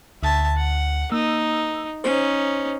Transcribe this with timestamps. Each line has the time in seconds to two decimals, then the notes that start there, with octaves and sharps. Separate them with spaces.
0.23 D2 E5 A5
0.57 F#5
1.12 A#3 D#4 E6
2.04 C#4 D#4 C5